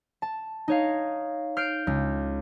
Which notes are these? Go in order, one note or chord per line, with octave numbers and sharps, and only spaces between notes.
A5
D#4 C#5 F5
F6 G6 C7 D7
C#2